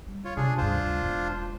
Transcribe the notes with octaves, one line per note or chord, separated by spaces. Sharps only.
G3
F4 C#5
C3 D4 G#4
D2 G2 D4 F4 C5
E1